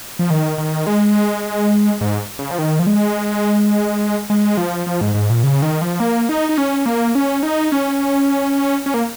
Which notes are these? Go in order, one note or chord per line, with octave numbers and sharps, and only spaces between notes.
F3
D#3
D#3
G#3
G#2
C#3
F3
D#3
F3
G#3
G#3
F3
F3
G#2
G#2
A#2
C#3
D#3
F3
A#3
D#4
D#4
C#4
A#3
C#4
D#4
C#4
C#4
A#3